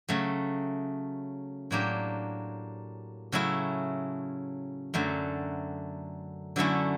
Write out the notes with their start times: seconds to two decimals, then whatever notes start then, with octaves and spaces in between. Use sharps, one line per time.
0.09 C#3 F#3 A3
1.71 A2 F#3 A#3 D4 G4
3.32 C#3 F#3 A3 C#4 E4
4.94 F#2 D3 F#3 A3
6.56 D3 F#3 A3 C#4 E4